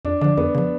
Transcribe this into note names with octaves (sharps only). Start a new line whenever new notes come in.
F2 D4
D3 F3 D4
F2 B3
C#3 F3